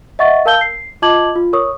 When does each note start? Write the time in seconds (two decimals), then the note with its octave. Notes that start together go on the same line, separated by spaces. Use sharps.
0.19 D#5 E5 F#5 C#6 A6
0.46 A#4 F5 A5 E6 G6 G7
0.61 C7
1.02 F4 D#5 A5 D6 G#6 F#7
1.36 F4
1.53 A#4 C#5 C#6 D#6